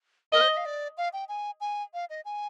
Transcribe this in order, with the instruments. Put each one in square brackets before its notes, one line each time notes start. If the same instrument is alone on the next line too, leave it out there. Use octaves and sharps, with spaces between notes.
[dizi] A#4 [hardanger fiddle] D#5
[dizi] C5
D#5
F5
D5
F5
G5
G#5
G#5
F5
D#5
G#5